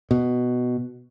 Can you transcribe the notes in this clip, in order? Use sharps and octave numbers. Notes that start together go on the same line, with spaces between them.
B2